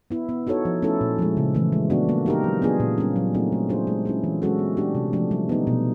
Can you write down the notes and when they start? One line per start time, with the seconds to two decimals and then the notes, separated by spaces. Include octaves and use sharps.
0.10 B3 E4
0.29 B3
0.47 D#4 F#4 A4 C#5
0.65 F3
0.82 A3 C#4 E4 A4
1.01 A#2
1.19 F3 G#3
1.37 C#3
1.55 E3 A3
1.72 G#3
1.90 B3 D4 F#4
2.09 A#3
2.26 D#4 G4 A#4
2.44 F#3
2.62 B3 D4 F4 G#4
2.80 A#2
2.98 G3 A#3 C#4
3.16 F#3
3.34 A3 C4 D#4 F#4
3.52 A3
3.69 D4 F4 G#4 C5
3.87 G#3
4.05 C#4 E4 G#4
4.24 E3
4.42 G#3 C#4 F#4 A4
4.59 B3
4.77 D4 G4
4.95 C3
5.13 F3 A3 D4
5.31 G3
5.49 B3 D#4
5.67 B2